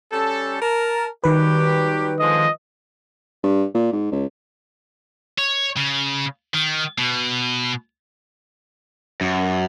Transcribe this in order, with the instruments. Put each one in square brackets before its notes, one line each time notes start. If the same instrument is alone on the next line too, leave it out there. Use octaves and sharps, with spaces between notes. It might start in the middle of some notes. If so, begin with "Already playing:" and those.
[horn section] G3 C#4 A4
A#4 A5
[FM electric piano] D#3 B4 [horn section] F#3 G3 G4
[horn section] D3 F3 G#3 [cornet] D#5
[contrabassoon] G2
A#2
G#2
C#2
[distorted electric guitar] C#5
C#3
D#3
B2
[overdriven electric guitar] F#2